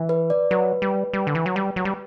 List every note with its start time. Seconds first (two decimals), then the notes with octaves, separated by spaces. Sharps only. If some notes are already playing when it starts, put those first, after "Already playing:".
Already playing: E3
0.09 B4
0.30 D5
0.51 F#3 B4
0.82 G3
1.13 G3
1.27 D3
1.35 E3
1.46 F#3
1.56 G3
1.76 F#3
1.85 G3